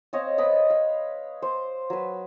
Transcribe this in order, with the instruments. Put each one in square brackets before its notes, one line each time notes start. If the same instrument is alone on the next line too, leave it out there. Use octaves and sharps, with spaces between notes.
[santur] C4 C#5 D#5 F5
B4 D#5 B5
F5
C5
F#3 B4